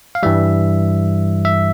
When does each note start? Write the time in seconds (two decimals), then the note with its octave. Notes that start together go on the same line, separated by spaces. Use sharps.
0.15 F5
0.23 G2 E3 G3 E5
1.45 E5